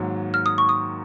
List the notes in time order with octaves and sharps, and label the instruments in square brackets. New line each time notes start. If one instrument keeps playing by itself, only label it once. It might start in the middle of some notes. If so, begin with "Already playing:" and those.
Already playing: [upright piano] G#2 D#3 F#3 A#3
[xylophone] F6
D#6
C#6
D#6